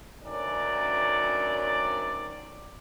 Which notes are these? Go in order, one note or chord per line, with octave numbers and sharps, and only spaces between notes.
D2 D#3 F#3 C#4 D5